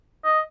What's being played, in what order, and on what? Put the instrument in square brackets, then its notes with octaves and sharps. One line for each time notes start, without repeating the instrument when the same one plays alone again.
[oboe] D#5